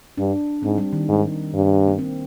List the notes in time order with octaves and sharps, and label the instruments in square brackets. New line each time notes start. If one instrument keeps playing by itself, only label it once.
[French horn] G2 [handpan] D4
[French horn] G#2 [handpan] C4
[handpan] G3
D#3
[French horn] G#2
G2
[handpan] A#3
C4